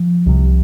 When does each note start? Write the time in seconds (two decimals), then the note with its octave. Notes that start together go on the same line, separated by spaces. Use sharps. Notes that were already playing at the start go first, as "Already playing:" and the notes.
Already playing: F3
0.26 C2 C3